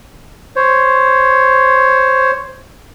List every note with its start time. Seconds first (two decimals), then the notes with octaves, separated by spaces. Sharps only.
0.56 C5 C#5